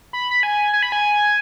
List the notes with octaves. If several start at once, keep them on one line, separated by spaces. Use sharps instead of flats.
B5
B5
G#5
G#5
B5
G#5